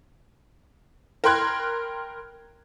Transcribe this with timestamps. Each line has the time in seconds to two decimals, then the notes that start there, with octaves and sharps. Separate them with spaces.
1.24 A#4 G5 B5 C6 F#6 G#6